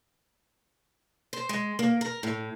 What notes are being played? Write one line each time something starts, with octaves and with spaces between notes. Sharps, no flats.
C5
G#3
A#3
A#4
A2